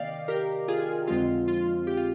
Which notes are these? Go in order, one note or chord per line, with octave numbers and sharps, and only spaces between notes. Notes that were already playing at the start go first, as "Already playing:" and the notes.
Already playing: C3 D#3 A#3 D5 D#5 F5 G5
G4 A#4
F4 G#4
F2 D3 G#3 C4 F4
F4
G4
F4